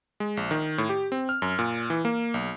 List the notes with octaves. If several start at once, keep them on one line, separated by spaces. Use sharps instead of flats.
G#3
A#1
D#3
A2
G4
C4
F6
F#2
A#2
E3
A#3
B1